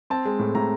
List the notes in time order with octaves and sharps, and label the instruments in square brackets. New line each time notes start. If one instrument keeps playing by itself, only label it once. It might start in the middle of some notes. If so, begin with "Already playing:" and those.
[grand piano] C4 A5
G#3
A2
A2 A#5